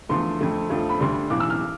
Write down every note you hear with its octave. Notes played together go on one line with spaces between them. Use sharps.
E2 D3 F3 A3 C6
F2 D3 A3
F2 D3 F3 A3
B5
D2 D3 G3 C6
B1 A2 E3 D6
E6
F6